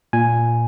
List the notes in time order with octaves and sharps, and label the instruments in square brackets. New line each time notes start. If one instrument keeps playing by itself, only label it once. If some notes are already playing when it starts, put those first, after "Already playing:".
[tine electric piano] A#2 G#5